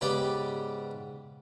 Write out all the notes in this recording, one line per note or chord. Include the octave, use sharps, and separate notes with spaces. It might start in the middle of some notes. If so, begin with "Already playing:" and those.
G#2 C#3 B3 G4 D5 B5